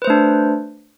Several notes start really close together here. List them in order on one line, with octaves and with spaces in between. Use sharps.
B4 C5 A3 D4